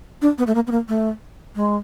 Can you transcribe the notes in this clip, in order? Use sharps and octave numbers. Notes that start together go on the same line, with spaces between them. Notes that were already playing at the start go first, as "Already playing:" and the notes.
D4
B3
A3
A#3
B3
A#3
A3
G#3